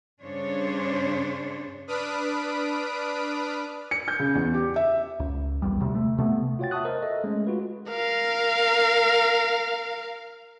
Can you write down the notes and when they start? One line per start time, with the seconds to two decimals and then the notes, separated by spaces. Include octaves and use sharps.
0.22 G2 C#3 D4 C5 C#5
1.87 D4 B4 D#6 F6 B6 D7
3.91 C#7
4.08 G6
4.19 C#3
4.35 E2
4.54 G4
4.76 E5
5.20 C#2
5.62 A#1 E2 G3
5.80 D1 D2 C3
5.95 A3
6.18 C3 A3 B3
6.59 F4 F#4 C#5 F#5 G5 A6
6.71 E5 F#5 A5 C#6 D#6 F#6
6.85 A#4 C5 D#5
7.02 A4 D#5 E5
7.24 G#3 A3 C#4
7.47 F4 F#4 B4
7.90 A#4 F5